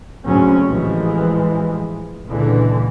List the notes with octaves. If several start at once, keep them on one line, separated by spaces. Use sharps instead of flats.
G#1 D2 C#3 F#3 C4 C#4
A1 E3 F3 G#3
C#2 A#2 D3 E3